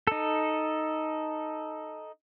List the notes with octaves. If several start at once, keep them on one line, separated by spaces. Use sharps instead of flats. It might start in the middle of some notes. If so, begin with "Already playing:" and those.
D#4 A4